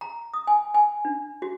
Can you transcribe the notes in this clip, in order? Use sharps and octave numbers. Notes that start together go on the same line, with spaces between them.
A#5
D#6
G#5
G#5
D4
F#4